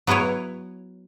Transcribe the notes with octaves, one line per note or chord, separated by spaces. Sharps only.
F#3 B3 E4 B4 C#5